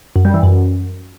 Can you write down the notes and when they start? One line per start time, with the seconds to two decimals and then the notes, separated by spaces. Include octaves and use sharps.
0.16 F#2
0.25 G3
0.34 E3
0.43 F#2